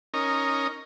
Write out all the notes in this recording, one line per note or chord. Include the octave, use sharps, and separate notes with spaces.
C#4 D#4 A#4